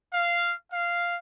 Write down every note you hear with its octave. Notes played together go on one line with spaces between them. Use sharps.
F5
F5